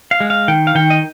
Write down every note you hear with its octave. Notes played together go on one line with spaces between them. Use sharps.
F5
G#3
F5
D#3 G5
F5
D#3 G5
D#5